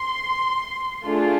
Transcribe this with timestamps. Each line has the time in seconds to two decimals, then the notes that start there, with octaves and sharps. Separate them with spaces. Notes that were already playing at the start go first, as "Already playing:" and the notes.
Already playing: C6
1.06 A3 D4 F4 G#4